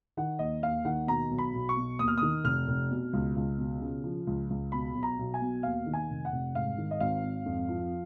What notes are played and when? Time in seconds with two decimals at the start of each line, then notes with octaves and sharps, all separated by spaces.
0.17 D#3 F#5
0.39 D#2 D#5
0.63 D#2 F5
0.85 D#3 F#5
1.07 B2 A#5
1.31 B1
1.38 B5
1.54 B1
1.69 C#6
1.77 B2
1.99 D#2 D#6
2.08 F6
2.18 D#3 D#6
2.44 F1 F6
2.68 F1
2.91 B2
3.13 C#2
3.36 C#2
3.58 B2
3.81 C#3
4.04 F3
4.27 C#2
4.50 C#2
4.72 B2 B5
4.95 B1
5.03 A#5
5.19 B1
5.34 G#5
5.41 B2
5.63 D#2 F5
5.86 D#3
5.93 G#5
6.10 F1
6.25 F#5
6.32 F1
6.55 G#2 F5
6.77 D#3
6.91 D#5
7.00 G#1 F5
7.23 G#1
7.46 F2
7.69 F3